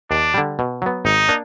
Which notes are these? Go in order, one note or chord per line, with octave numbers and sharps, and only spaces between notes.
D#2 D4
D3 G3
B2
F#3 B3
G#1 D#4
A#3 D4